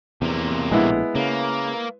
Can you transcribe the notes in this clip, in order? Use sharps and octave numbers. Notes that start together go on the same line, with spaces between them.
E2 C3 A#3
A#1 A2 G#3 B3 E4
C#3 A#3